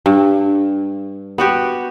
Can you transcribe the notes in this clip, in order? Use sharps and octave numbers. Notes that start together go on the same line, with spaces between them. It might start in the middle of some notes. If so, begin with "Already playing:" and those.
G2
B3 F#4 G4